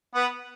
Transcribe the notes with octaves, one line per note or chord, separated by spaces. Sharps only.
B3 B4